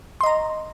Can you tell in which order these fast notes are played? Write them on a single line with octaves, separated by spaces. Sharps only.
C6 D#5 A#5